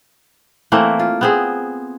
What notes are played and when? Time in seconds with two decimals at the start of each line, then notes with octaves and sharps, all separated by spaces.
0.72 E3 A3 A#3 C4
0.99 F4
1.21 B3 C4 G#4